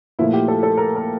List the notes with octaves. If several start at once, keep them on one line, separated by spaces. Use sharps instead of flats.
A#2 F3 A3 E4
G4
A4
A4
A#4
A#4